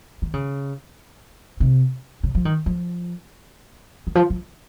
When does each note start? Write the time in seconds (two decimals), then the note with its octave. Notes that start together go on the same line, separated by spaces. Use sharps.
0.22 D#3
0.34 C#3
1.60 C3
2.24 C#3
2.35 F3
2.45 D#3
2.66 F3
4.07 D#3
4.15 F3
4.30 F3